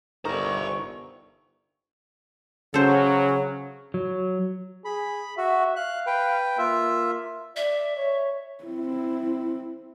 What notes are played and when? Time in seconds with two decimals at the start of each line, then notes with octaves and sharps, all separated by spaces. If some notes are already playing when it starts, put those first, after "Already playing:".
0.25 G1 D#4 A#4 C5 D5 C#6
2.74 C#3 F#3 C#4 A4 C5
3.94 F#3
4.85 G#4 B5
5.37 F#4 E5
5.76 F5 F#6
6.07 B4 G5
6.58 A#3 F4 E5
7.56 D5 E5
7.97 C#5
8.64 C4 E4